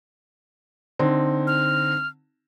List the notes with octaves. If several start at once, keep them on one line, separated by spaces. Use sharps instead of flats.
D3 C4 D#4
F6